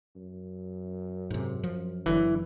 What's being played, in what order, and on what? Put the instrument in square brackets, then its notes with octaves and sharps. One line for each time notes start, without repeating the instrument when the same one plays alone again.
[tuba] F#2
[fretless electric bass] G#2 C3
F3
[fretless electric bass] F#1 D3 F#3 [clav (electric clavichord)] E3